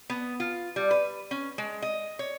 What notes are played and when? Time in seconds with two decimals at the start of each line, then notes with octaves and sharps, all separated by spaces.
0.10 B3
0.40 F4
0.76 G3
0.91 B4
1.31 C#4
1.58 G#3
1.82 D#5
2.19 C#5